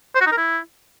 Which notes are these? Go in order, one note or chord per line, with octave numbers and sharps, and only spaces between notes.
C5
F#4
D#4
A#4
E4